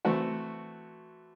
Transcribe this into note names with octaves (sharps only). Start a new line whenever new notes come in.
E3 A3 C4 F#4